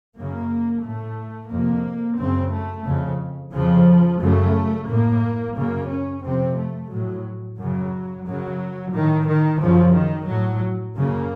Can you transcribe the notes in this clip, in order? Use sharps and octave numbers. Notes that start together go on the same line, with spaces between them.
F#2 C#3 A#3
A2 A3
F2 C3 A#3
F#2 C#3 C4
A3
F2 C#3
F2 C#3 F3
F#2 C#3 A3
A2 A#3
F#2 C#3 A#3
C#4
F2 C3 C4
A3
A2 F#3
F#2 C#3 F#3
F#2 C#3 F#3
A2 D#3
D#3
F#2 C#3 F3
D#3
A2 F#3
F#2 C#3 A#3